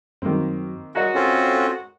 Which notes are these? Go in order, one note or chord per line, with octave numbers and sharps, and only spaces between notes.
F#2 D#3 F#3 A#3 C4
G#3 F#4 A#4 C#5 D#5 A#5
C4 C#4 F4 A4